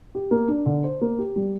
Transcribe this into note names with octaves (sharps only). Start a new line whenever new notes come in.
G4
A#3
D4
D3
C5
A#3
G4
G3